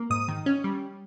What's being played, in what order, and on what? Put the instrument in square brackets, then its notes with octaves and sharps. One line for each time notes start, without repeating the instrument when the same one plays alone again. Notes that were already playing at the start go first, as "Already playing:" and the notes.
Already playing: [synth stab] A#3
G#2 D#6
D#3
C#4
G3